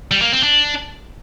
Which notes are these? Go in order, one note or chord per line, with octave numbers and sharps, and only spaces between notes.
G3
A#3
C4
D4